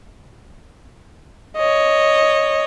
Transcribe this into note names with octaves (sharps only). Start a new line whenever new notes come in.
C#5 D#5